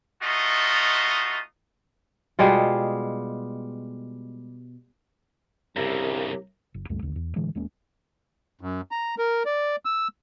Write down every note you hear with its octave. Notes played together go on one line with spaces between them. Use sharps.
A3 D#4 F4 F#4 D#5
B2 G3 G#3 F4
C2 G2 C#3 G4 A#4 E5
F#1
C#2 F#2 G3 A3
D1 A#1 D#2 D3
E2
A2 D3 E3 G#3
D#1 G#3 A#3 C#4
F#2
A#5
A#4
D5
E6